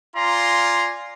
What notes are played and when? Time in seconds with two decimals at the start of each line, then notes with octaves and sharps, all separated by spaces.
0.16 F4 D5 G#5 A#5 C6